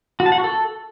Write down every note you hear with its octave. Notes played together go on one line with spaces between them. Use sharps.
F#4
A5
F#5
F#4
A4